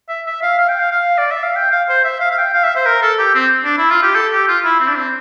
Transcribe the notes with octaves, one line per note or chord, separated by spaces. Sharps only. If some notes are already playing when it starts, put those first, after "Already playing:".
E5
E5
F5
F5
G5
F5
F5
D5
E5
F5
G5
F5
C5
E5
F5
F5
G5
F5
E5
C5
A#4
A4
G4
C4
D4
E4
F4
G4
A4
G4
F4
E4
C4
D4
C4